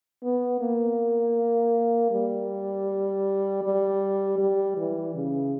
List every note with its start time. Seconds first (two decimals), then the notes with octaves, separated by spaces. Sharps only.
0.23 B3
0.60 A#3
2.11 G3
3.63 G3
4.38 G3
4.77 E3
5.15 C#3